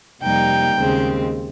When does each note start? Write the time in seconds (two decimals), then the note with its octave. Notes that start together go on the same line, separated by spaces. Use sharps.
0.22 F2 C3 G3 A#3 D#4 G5
0.77 D#2 C#3 G#3 C4